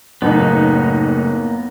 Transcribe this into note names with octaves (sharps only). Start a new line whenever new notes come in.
F#1 A2 A#3 B3 D#4